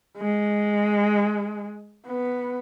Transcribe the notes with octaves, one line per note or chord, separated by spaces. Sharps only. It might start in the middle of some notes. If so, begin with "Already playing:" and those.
G#3
B3